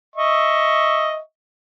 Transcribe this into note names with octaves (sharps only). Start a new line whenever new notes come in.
D#5 E5 C#6